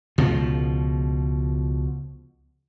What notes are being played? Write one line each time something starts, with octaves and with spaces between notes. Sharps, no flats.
C#2 B2 F3